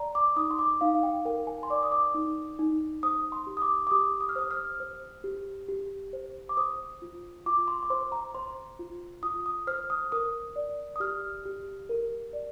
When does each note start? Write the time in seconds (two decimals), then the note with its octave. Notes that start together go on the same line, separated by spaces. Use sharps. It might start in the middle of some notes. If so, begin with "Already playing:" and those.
Already playing: D5 A#5
0.15 D6
0.36 D#4 D#6
0.51 C6
0.59 D6
0.81 D#4 F5
0.95 F5
1.03 G5
1.25 A#4 G5
1.47 G#5
1.63 C6
1.70 D5 D6
1.83 D#6
1.92 D6
2.14 D#4
2.59 D#4
3.03 C5 D#6
3.32 C6
3.47 G4
3.57 D#6
3.62 D6
3.87 D6
3.91 G4 D#6
4.21 D#6
4.29 F6
4.36 C5 D#6
4.51 F6
4.80 C5
5.24 G4
5.68 G4
6.13 C5
6.49 D6
6.57 C5 D#6
7.02 F4
7.46 F4 D6
7.68 C6
7.83 D6
7.90 C5 C6
8.12 A#5
8.35 C5 C6
8.79 F4
9.23 F4 D#6
9.46 D#6
9.67 C5 F6
9.90 D#6
10.12 A#4 D#6
10.56 D5
10.96 D#6
11.00 G4 F6
11.45 G4
11.89 A#4
12.33 D5